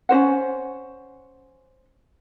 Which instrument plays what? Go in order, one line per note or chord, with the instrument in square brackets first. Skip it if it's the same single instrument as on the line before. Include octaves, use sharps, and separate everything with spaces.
[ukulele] C#4 F#4 C5 F#5